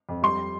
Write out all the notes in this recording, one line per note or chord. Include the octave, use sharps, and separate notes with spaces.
F2
G3 C6